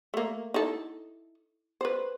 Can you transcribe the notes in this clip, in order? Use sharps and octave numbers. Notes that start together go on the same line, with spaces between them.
A3 A#3
D#4 E4 A4
B4 C5